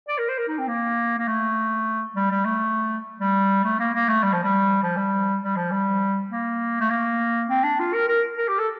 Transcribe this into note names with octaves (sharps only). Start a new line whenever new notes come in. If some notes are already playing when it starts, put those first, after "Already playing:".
D5
A#4
C5
A#4
D#4
C4
A#3
A#3
A3
G3
G3
A3
G3
A3
A#3
A#3
A3
G3
F3
G3
F3
G3
G3
F3
G3
A#3
A3
A#3
C4
D4
F4
A#4
A#4
A#4
G4
A4